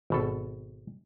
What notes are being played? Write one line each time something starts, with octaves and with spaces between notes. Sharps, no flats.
G#1 B2 A4